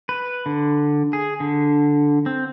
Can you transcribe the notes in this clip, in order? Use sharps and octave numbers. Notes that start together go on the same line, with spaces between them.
B4
D3
G#4
D3
C4